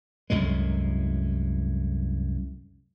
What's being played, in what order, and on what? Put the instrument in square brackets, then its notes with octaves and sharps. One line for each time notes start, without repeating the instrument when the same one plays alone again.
[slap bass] C2 F#2 A2 G#3